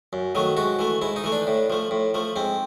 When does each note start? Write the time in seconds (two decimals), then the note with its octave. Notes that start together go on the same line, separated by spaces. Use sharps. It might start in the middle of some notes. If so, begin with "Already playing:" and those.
0.13 F#2
0.35 D#3 F#3 A3
0.57 G#2 F#4
0.79 E3 A3
1.02 G#2 E4
1.16 D#4
1.24 E3 A3
1.32 D4
1.47 A2
1.70 F3 A3
1.91 A2
2.14 F3 A3
2.36 G#2 C4